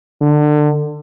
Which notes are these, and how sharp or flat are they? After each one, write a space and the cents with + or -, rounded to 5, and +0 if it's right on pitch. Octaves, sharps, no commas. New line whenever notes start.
D3 +25